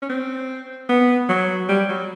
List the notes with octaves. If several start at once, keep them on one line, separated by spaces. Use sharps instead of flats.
C#4
C4
B3
F#3
G3
F#3